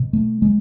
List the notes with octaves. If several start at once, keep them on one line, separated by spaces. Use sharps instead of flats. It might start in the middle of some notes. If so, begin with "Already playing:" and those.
Already playing: B2
A3
G#3